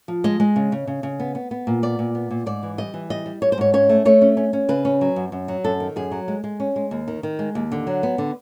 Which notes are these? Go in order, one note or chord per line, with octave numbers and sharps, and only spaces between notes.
F3
G#3 D#5
G#3
C#3
C#3
C#3
C#3
B3
B3
B3
A#2
B3 D5
A#2
B3
A#2
G#2 D5
E3
G3 D#5
E3
G3 D#5
G3
G3 C#5
C5
G#2 C#5
C#4 C#5
A3
A3 C#5
C#4
C#4
C#4
C#3 B4
C#4
F#3
F#2
F#2
F#3
F#2 A4
D#3
F#2 G#4
F#3
G#3
G#3
C#4
G#3
D#2
D#3
D#3
G#3
D#2
D3
F#3
B3
D3